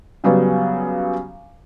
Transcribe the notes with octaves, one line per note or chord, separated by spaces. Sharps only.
C#3 F#3 G3 B3